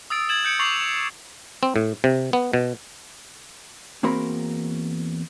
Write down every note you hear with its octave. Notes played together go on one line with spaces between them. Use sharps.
D#6 E6 A6 D7
D#6 G#6 A6 E7 F#7
G6 C#7 D7
C#6 D6 A6 C7 F7 F#7
C4
A2
C3
B3
B2
E2 A#3 C4 F#4 A#4 B5